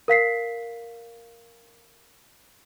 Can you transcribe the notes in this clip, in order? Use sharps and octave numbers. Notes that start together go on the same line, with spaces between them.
A#4 F5 B6 C7